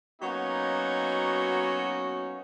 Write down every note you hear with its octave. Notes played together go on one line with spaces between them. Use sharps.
F#3 A#3 B3 C#4 D#4 F#4